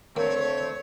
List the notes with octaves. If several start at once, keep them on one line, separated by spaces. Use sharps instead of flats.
D3 A3 A#3 C4 C#5